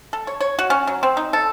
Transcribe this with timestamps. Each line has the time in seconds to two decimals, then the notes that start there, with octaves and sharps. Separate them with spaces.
0.13 A4
0.27 C#5
0.41 C#5
0.59 F#4
0.70 C#4
0.87 F#3
1.03 C4
1.17 D#4
1.33 A4